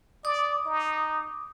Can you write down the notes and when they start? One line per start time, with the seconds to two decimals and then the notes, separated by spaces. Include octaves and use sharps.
0.25 D5 D6 D#6
0.66 D#4